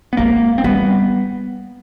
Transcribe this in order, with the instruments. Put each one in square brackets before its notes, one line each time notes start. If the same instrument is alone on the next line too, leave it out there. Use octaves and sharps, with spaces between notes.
[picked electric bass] B3
[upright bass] G#3 [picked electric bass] A#3
[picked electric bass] C4
[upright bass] G3 [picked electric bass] B3